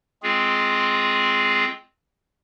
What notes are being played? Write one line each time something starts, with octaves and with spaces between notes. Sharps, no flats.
G#3 C4 F4 G#4